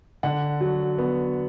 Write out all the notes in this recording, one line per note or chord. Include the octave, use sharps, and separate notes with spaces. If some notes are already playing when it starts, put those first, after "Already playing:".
D3 F#5
F#3
B3